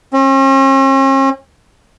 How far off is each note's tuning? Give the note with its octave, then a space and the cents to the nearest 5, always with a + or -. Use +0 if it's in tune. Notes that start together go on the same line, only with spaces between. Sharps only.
C#4 -45